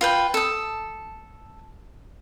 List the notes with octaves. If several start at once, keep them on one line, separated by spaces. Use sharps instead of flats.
F4 B4 G5
A4 D#6